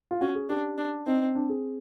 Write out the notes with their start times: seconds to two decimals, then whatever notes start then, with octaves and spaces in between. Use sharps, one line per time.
0.11 F4
0.21 C#4 F#4
0.35 G#4
0.49 D4 G4
0.78 D4
1.07 C4 D#4
1.35 D4
1.49 G#4